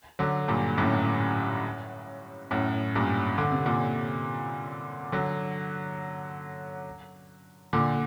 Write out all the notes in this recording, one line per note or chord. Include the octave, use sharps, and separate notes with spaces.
D3 F#3
G2 A#2
F#2 A2
F#2 A2
G2 A#2
D3
C3
A#2 D3
D3 F#3
A#2 D3